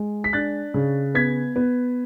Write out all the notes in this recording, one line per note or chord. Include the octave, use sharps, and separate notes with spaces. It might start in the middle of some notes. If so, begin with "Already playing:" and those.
Already playing: G#3
B6
D4 F#6 A6
C#3
B3 G#6 B6
B3